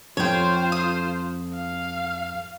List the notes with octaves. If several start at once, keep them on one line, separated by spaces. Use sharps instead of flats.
F2 F4 C5 C#5 G5
D#6
F5